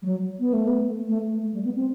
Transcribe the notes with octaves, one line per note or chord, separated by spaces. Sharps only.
G3
F#3
B3
A3
B3
A3
A3
G3
B3
C4